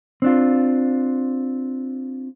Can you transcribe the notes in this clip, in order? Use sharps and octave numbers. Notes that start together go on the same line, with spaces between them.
C4 D4 F4